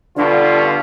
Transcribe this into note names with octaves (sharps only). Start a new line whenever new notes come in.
G2 B2 D3 D4 F4